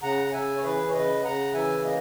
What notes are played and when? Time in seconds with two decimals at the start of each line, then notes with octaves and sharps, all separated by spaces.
0.02 C#3 F#5 A#5
0.26 F#5
0.33 C#3 E5 G#5
0.56 C#5
0.63 E3 G#4 B4
0.88 C#5
0.93 C#3 B4 D#5
1.24 C#3 F#5 A#5
1.54 E3 E5 G#5
1.84 A#3 D#5